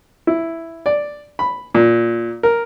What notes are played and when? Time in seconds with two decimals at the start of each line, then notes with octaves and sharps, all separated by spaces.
0.27 E4
0.86 D5
1.39 B5
1.75 A#2
2.43 A#4